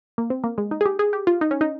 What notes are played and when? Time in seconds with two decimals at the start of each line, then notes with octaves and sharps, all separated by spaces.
0.18 A#3
0.30 C4
0.44 A#3
0.58 G#3
0.71 D#4
0.81 G#4
0.86 G4
0.99 G#4
1.13 G4
1.27 F4
1.41 D#4
1.51 C#4
1.61 D#4